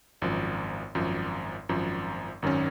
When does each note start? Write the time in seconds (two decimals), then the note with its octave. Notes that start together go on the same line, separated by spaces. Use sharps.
0.22 G#1 F#2 F3
0.95 G#1 F#2 F3
1.69 G#1 F#2 F3
2.42 G#1 F#2 D#3 F#3 C#4